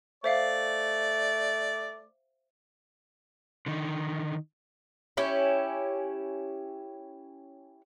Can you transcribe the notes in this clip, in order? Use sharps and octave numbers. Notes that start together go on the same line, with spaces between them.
A3 C5 D5 E5 F5
D3 D#3
C#4 E4 G4